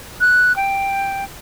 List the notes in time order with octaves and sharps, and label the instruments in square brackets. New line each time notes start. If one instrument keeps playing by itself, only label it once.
[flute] F#6
G5